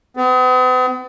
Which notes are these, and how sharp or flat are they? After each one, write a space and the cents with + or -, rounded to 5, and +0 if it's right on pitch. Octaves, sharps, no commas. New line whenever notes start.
B3 +45